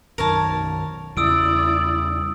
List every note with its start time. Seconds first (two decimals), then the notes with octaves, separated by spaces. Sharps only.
0.18 B1 F#2 D#3 A#4 C#5 A5
1.17 E2 C#3 G3 E4 D5 D#6 E6 D7